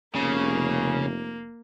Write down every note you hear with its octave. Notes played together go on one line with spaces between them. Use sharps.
F1 C#3 A#3